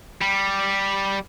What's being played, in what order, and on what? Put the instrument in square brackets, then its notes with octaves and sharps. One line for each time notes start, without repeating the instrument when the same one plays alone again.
[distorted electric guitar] G3